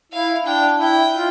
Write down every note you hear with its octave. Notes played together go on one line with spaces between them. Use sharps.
E4 F5
D4 G5
E4 G5
F4